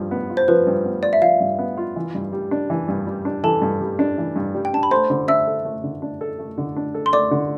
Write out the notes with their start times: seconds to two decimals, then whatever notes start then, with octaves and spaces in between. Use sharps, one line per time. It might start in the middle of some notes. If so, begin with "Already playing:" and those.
Already playing: G2 F3
0.11 B3
0.30 F4
0.37 C5
0.48 F3 B4
0.67 G2
0.85 B3
1.03 F4 D5
1.13 E5
1.22 F3 F5
1.40 G2
1.59 B3
1.77 F4
1.96 E3
2.15 G2
2.32 G3
2.51 D4
2.70 E3
2.88 G2
3.07 G3
3.25 D4
3.43 E3 A4 A5
3.62 G2
3.81 G3
3.99 D4
4.18 E3
4.36 G2
4.55 G3
4.65 G5
4.73 D4 A5
4.83 B5
4.91 A3 C5 C6
5.10 D3
5.28 D4 E5 E6
5.47 A4
5.65 A3
5.84 D3
6.02 D4
6.21 A4
6.39 A3
6.58 D3
6.76 D4
6.95 A4
7.06 C6
7.13 A3 D5 D6
7.31 D3